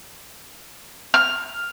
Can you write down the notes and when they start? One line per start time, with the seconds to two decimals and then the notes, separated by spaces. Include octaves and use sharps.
1.14 F6